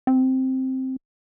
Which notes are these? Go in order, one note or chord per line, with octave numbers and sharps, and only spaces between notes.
C4